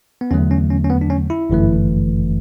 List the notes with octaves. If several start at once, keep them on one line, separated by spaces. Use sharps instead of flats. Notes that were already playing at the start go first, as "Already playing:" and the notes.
B3
E2 D3 F#3 A3 C#4
C#4
C#4
C#4
B3
D4
C#4
E4
G1 F#2 E3 A3